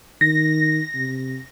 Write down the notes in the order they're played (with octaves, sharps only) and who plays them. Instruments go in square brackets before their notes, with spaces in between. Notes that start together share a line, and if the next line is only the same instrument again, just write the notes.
[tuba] D#3 [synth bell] A#6
[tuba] C3